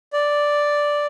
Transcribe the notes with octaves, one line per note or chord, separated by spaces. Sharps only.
D5